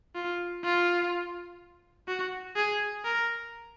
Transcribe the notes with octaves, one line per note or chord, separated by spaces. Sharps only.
F4
F4
F#4
G#4
A#4